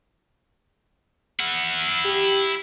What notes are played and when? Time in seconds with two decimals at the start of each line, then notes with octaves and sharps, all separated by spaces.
1.40 E4 F#5
2.05 G4